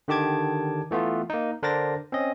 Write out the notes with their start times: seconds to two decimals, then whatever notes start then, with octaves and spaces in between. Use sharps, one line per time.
0.08 D3 D#3 G4 A5 D6 G#6
0.91 E3 A3 B3 F4
1.30 A#3 D#4
1.62 D3 D4 A#4 C5 A6 A#6
2.12 C4 C#4 D#5